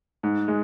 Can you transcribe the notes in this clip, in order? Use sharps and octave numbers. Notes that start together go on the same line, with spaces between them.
G#2
G#3